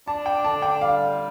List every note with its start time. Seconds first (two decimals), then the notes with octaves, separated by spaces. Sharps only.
0.07 D4 A5
0.26 G5
0.44 D3 A5
0.62 G5
0.81 G3 F5